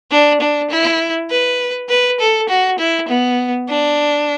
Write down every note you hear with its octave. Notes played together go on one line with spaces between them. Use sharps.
D4
D4
E4
B4
B4
A4
F#4
E4
B3
D4